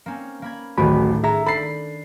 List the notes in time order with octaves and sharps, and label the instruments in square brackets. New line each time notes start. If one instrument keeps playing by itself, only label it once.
[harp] A#3 C4 C#4
A#3 B5 G#6
[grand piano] D1 A1 [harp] A2 D#3 [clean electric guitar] F#4 B5
[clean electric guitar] G#4 A#5 [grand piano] E5 [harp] A#6
[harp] D4 [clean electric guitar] A4 [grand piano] B5 A6 C7